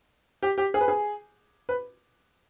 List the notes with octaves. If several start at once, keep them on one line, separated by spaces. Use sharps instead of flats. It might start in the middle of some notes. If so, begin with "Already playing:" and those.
G4
G4
G#4
B4
G#4
B4